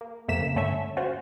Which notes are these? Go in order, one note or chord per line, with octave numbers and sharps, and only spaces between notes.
A#3
F2 C3 A3 A#3 B6 E7
C#3
G2 D3 A3 C#4 E5
C#4 F4 F#4 C5